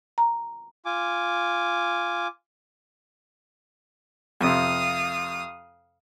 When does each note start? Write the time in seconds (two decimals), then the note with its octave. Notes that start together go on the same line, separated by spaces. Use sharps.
0.18 A#5
0.85 F4 G#5 D6
4.41 F2 C3 F5 D#6